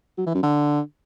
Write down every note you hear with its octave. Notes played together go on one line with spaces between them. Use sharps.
F#3
E3
F#2
D3